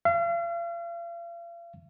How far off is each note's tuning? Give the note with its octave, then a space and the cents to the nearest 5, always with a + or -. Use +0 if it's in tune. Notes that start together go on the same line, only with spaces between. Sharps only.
F5 -40